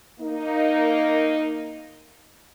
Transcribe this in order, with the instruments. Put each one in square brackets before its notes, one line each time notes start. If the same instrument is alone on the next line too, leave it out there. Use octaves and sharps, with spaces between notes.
[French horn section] A#3 D#4